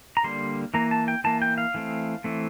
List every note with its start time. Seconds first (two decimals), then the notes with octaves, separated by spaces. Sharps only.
0.17 A#5
0.23 D3 G3 A#3 C6
0.74 E3 A#3 A#5
0.91 A5
1.08 G5
1.24 E3 A#3 A5
1.42 G5
1.58 F5
1.74 E3 A3 C4
2.24 E3 A3 C4